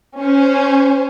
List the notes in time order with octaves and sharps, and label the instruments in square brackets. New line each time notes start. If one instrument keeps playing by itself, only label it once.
[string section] C#4 C5